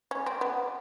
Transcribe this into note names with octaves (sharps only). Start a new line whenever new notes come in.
C#4
C4
B3